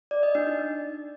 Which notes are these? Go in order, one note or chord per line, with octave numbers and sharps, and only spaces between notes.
D5
D#5
D4
D#4